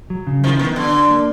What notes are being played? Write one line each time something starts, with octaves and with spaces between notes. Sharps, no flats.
F#3
C#3
D#3 F3 E4
D#3 B3
D3 F#3
D4
A#3